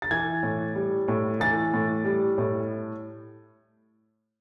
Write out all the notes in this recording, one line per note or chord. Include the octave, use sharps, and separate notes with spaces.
A6
E3 G#6
A2
G3
A2
E3 A6
A2
G3
A2